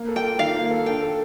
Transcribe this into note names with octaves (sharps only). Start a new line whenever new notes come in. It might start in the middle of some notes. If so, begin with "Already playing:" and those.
Already playing: A#3
A4
G5
F4
D#3 F5
A#3
A4
D4 G5
A4